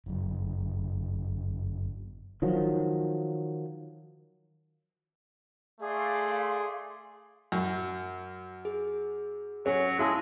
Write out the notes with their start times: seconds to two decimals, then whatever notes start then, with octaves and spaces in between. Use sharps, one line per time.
0.06 G1 F#2
2.42 D#3 F3 F#3
5.81 A3 G#4 D5 F5 C6
7.52 F#2
8.65 G#4
9.66 F#3 C#4
9.99 G#3 E4 F5 A5